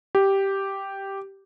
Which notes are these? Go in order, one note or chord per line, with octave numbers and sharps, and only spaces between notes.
G4